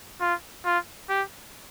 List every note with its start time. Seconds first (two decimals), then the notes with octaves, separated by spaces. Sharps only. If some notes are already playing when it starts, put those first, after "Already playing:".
0.21 F4
0.65 F4
1.09 G4